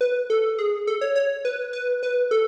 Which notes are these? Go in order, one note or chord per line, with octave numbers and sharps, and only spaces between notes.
B4
A4
G#4
A4
C#5
C#5
B4
B4
B4
A4